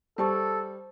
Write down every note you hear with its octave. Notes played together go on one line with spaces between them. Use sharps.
G3 A4 C5 A5 C#6